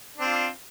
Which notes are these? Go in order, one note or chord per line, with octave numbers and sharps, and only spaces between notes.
C4 D4 F4